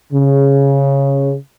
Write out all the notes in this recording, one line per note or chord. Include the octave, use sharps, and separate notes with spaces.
C#3